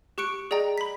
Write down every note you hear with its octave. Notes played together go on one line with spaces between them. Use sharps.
G4 C#6 F#6 C#7 D7
G#4 D5 D#5 G5 A#5
B5 B6